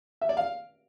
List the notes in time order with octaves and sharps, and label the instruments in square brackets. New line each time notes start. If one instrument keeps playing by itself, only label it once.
[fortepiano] E5
D5
F5